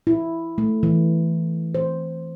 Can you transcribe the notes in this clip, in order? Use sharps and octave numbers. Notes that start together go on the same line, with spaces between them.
E4
A3
E3
C5